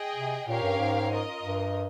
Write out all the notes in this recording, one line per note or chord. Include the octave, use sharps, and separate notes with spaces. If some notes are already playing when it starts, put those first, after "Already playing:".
Already playing: G#4 D#5 G5
C3
A#2 C#4 G4 A#4 C#5 F5
G2
G#2
F4 A#4 D#5
G2